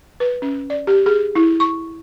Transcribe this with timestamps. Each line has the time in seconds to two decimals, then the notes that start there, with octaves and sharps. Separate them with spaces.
0.20 B4
0.42 C#4
0.70 D5
0.87 G4
1.06 G#4
1.35 E4
1.60 C#6